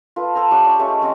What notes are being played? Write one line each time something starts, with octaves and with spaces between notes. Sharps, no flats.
F4 A4 B4
A4 C5 G#5 A#5
C#4 G4 F#5 G#5
D5 G5 A5 C#6
G#3 A3 C#4 G4
G#3 C4 C#4 D#5